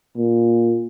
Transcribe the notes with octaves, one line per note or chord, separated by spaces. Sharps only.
A#2